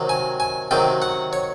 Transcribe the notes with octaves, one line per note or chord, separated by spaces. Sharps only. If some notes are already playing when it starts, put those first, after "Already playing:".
Already playing: C3 D#3 F#3
G#5
G#5
C3 D#3 F#3 G5
F#5
C#5